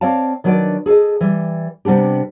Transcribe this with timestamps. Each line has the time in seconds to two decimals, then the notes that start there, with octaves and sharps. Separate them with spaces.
0.01 C4 C#5 D5 F5 A5
0.44 D#3 F#3 D4 A#4 B4 D5
0.86 G#4 A4 C5 D#5
1.21 E3 G3
1.85 C3 G3 B3 D4 G4